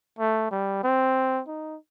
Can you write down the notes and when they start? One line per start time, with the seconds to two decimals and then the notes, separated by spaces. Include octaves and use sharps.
0.19 A3
0.51 G3
0.84 C4
1.48 D#4